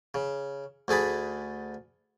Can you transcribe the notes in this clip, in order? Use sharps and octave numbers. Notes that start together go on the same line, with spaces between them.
C#3
D2 A3 G#4 D5 B5